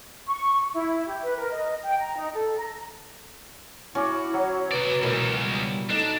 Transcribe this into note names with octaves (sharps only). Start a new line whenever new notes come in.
C#6
E4
G4
B4
A#4
D#5
G5
A#5
D#4
A4
A#5
C#4 E4 F#4 D6
F#3 C#5
C3 B4 D5
C#2 F#2 B2 E3 A#4
G3
D4 D#4 A4